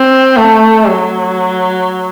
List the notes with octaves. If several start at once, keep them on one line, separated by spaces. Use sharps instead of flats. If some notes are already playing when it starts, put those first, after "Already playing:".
Already playing: C4
A3
F#3